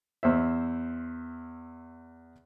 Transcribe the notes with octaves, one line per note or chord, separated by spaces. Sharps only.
E2 C5 E5